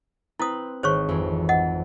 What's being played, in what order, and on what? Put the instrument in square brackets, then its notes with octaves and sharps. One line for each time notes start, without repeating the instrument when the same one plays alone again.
[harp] C4 B4 [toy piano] E4 D#6
[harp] G#1 [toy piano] C5 C#5 C#6
[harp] F2 E3 F#3
[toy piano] D#5 F#5